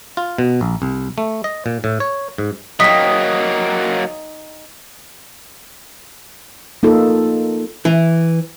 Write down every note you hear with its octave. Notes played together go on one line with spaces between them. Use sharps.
F4
B2
A#1
C2
A3
D#5
A#2
A2
C#5
G#2
F#3 A#3 D#4 G5 D#6 B6
A#3 D#4 F4 A4
E3